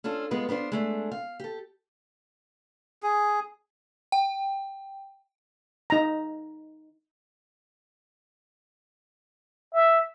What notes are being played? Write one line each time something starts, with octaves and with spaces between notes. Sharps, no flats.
C#4 D4 F4 A4
G#3 B3 F4 B4
B3 D4 F4 C5
G#3 A3 D4
F5
G4 A4
G#4
G5
D#4 A#5
E5